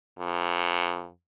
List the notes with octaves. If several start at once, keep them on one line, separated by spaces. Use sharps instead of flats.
F2